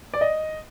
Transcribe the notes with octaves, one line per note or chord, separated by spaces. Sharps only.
D5
D#5